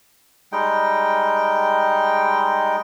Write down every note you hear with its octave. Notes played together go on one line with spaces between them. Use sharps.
G3 G#3 D#4 G5